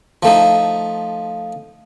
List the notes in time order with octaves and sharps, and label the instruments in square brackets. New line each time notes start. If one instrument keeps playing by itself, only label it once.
[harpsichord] F3 A3 D#4